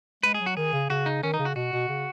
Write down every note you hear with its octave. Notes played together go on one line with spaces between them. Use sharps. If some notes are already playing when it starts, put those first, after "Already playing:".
G#3 B4
G#4
F#3
F#4
D#3 G#4
C#3
C#3 F#4
D#4
D#3 C#4
D#4
C#3
F#4
B2 F#4
B2
C#3